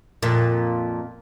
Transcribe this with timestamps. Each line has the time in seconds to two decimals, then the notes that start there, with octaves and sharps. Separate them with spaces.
0.23 F2 A#2